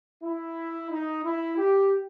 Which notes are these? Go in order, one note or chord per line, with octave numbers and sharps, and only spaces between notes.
E4
D#4
E4
G4